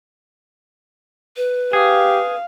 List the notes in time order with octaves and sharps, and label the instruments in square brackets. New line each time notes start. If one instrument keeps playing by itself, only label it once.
[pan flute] B4
[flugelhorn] G4 [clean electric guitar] G#4 [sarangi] F5